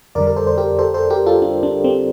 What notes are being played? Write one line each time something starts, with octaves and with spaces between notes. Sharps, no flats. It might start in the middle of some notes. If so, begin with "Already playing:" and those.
F2 D3 G3 A#4 D5
A#4
A4 C5
C5
G4 A#4
A4 C5
A4 C5
G4 A#4
F4 A4
D4 F4
D4
C4